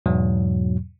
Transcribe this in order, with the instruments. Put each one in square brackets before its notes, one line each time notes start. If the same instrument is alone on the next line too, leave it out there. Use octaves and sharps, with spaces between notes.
[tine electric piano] E2 G#2 B2 F#3